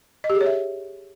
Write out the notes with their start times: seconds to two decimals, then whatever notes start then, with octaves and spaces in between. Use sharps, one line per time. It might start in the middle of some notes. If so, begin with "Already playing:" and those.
0.24 D#5
0.30 G4
0.35 G#4
0.41 C#5
0.46 E5